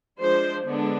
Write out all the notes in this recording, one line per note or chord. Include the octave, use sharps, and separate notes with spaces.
F3 G#3 D4 C5
D3 G#3 B3 D4